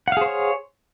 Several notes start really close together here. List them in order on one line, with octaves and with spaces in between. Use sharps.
F#5 F5 G#4 C5 C#5